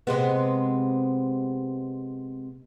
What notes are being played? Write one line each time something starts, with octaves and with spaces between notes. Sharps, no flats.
C3 G#3 B3